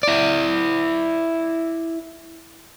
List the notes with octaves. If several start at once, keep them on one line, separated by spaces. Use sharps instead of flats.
E4 D5